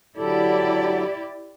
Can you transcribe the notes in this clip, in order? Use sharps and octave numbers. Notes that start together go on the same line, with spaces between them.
D3 F#3 E4 G4 A4 D5